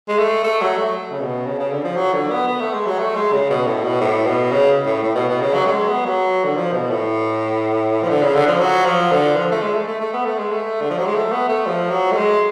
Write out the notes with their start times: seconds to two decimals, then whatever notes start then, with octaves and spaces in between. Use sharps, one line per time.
0.09 G#3
0.18 A3
0.44 A3
0.61 F#3
0.78 A3
1.12 C#3
1.20 B2
1.46 C#3
1.59 C#3
1.71 D3
1.84 F3
1.96 F#3
2.14 D3
2.31 B3
2.48 B3
2.61 A3
2.73 G#3
2.86 F#3
2.99 A3
3.16 G#3
3.32 C#3
3.50 B2
3.67 A2
3.84 B2
4.01 A2
4.26 B2
4.52 C#3
4.86 A2
5.03 A2
5.15 B2
5.29 B2
5.41 C#3
5.54 F#3
5.66 A3
5.71 G#3
5.88 B3
6.05 F#3
6.44 D3
6.56 F3
6.72 B2
6.90 A2
8.03 F3
8.09 D3
8.22 C#3
8.35 D3
8.47 F3
8.60 F#3
8.85 F3
9.11 D3
9.36 F3
9.52 A3
9.62 G#3
9.75 A3
9.87 A3
10.01 A3
10.14 B3
10.25 A3
10.38 G#3
10.51 A3
10.81 D3
10.90 F3
10.99 F#3
11.06 G#3
11.15 A3
11.32 B3
11.49 A3
11.66 F3
11.91 F#3
12.12 A3
12.17 G#3